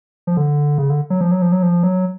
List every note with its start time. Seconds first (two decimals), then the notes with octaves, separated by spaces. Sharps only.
0.27 F3
0.37 D3
0.78 C#3
0.90 D3
1.10 F#3
1.21 F3
1.31 F#3
1.42 F3
1.52 F#3
1.63 F3
1.83 F#3